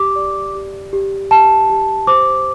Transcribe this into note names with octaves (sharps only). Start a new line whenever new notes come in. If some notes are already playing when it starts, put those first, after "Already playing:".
Already playing: G4 D6
D5
G4
G4
G4 A5
G4
C5 D6